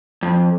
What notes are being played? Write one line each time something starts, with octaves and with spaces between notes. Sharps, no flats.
F2